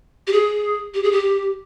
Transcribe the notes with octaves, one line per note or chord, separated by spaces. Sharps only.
G4
G#4
G4
G#4
G4